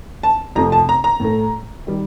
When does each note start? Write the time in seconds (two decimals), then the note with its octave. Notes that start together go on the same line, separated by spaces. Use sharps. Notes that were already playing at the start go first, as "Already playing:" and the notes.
0.23 A5
0.55 F2 C3 F3 A3 A#5
0.72 A5
0.89 A#5
1.04 A#5
1.20 A2 A3
1.87 D#3 G3